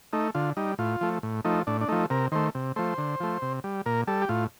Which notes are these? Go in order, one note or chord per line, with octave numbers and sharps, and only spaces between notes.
A3 D#4
D3 F4
G3 D#4
A2 F4
F3 A3
A2
F3 A3 D#4
A2 D4
D4
F3 A3 D#4
C3 A#4
D#3 A3 C5
C3
F3 A3 C5
D3
F3 A3
C3
G3
A#2 A#4
G3 A4
G4
A2 F4